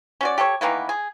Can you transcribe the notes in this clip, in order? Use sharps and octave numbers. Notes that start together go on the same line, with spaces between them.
C#4 F#4 D5
G4 A4 A#4 C#5
D#3 E3 A#3 B3
G#4